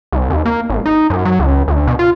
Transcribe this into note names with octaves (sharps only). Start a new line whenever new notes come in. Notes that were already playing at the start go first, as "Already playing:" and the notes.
C2
D#2
A#3
G#1
D#4
F#2
F#3
C#2
D2
B2
F4